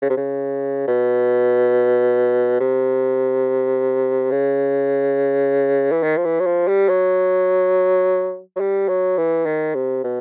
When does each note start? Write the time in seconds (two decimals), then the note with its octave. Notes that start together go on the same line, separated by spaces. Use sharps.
0.02 C#3
0.10 C3
0.17 C#3
0.88 B2
2.60 C3
4.31 C#3
5.92 E3
6.03 D#3
6.17 F3
6.25 E3
6.40 F#3
6.46 F3
6.68 G3
6.89 F#3
8.56 F#3
8.60 G3
8.89 F#3
9.18 E3
9.46 D#3
9.75 C3
10.04 B2